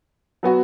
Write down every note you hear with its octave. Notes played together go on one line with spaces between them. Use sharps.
F#3 B3 F#4